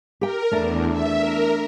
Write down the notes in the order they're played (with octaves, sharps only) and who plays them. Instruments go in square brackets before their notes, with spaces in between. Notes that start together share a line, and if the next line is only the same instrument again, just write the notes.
[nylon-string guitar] G4 G5 [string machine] A#4
[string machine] E2 [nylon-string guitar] A3 D4
[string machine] E5
A#4